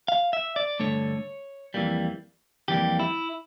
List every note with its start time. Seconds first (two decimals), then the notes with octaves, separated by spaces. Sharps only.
0.08 F5
0.33 E5
0.56 D5
0.80 G2 D3 A3 C#5
1.74 F2 E3 G3 A#3
2.68 F2 E3 G3 A#3 G4
2.99 E4